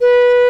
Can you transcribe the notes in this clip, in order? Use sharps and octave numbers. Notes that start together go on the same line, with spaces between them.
B4